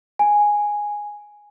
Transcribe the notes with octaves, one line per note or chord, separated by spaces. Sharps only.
G#5